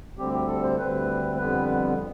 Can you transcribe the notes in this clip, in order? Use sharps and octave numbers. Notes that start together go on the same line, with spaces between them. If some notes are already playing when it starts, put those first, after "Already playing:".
D2 D3 G3 C4 G4
G4
A4
C5
D2 D3 G3 C4 B4
F2 D3 G3 B3 B4